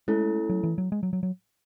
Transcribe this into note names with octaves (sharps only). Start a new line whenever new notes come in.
G#3 A3 C#4 E4 A4
F#3
E3
F#3
G#3
F#3
F#3
F#3